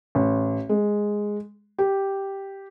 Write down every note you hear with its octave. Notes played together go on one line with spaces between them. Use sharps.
A1
G#3
G4